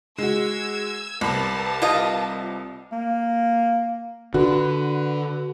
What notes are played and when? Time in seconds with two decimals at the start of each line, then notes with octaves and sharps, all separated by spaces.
0.18 G#3 F#4 E6 G#6
1.21 C2 C3 A#4 B4 A5 B5
1.82 F4 D#5
2.92 A#3
4.34 D3 F#4 B4